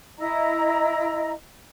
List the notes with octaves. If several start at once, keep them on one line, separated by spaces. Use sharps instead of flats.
E4 D#5 A#5